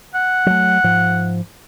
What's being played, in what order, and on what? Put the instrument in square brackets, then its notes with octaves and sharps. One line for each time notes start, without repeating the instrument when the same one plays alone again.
[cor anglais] F#5
[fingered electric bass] F#3 A3
G#2 F3